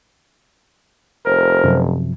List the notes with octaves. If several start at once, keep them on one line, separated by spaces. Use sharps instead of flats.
F1 A#4 C5
F#2 C3 F3